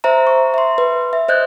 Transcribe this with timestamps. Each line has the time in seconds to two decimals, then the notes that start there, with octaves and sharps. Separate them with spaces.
0.04 C5 E5 A#5
0.27 C#6
0.54 E5 C6
0.78 B4
1.13 E5
1.28 C5 D#5 F#6 G6